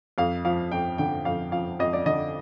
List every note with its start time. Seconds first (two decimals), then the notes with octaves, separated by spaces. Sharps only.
0.18 F2 F5
0.45 F3 F5
0.71 F2 G5
0.98 D3 G5
1.25 F2 F5
1.52 F3 F5
1.79 F2 D#5
1.93 D5
2.06 D3 D#5